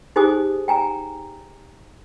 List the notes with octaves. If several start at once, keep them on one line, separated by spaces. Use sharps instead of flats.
D#4 G4 G#4 C5 G#5 D#6
G5 G#5 A#5